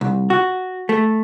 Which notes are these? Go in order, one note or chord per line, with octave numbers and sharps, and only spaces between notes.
C2
F#4
A3